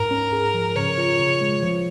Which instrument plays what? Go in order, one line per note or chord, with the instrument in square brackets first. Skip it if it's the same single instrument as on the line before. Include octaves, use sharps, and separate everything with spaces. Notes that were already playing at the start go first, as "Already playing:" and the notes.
Already playing: [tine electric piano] G#2 [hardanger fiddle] A#4
[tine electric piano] C#4
G#4
F3
[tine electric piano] C#3 [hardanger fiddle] C#5
[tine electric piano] F4
C#3
G#3
F3